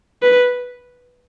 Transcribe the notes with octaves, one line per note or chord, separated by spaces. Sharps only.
B4